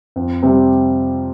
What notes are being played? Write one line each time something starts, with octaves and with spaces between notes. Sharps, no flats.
F2
C3 G3 C4